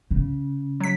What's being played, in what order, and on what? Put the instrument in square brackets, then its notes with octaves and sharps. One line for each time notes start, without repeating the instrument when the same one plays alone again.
[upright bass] C#3
[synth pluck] F#3 B6